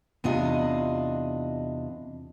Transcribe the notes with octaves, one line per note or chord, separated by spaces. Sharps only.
E2 C3 D4 F4 D#5